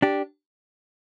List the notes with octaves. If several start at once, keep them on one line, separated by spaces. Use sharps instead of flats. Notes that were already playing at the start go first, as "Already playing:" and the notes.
D4 G4